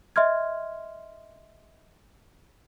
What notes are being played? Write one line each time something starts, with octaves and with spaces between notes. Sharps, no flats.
D#5 E5 C6 F6 G#6